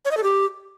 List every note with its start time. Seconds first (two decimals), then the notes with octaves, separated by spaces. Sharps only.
0.05 C#5
0.11 D#5
0.17 A4
0.23 G4